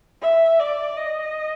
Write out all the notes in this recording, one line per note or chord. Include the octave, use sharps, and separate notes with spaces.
E5
D5
D#5